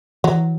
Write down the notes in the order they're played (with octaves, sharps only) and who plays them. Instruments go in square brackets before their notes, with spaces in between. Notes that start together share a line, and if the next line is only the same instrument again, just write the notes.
[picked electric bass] E3 [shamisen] F#3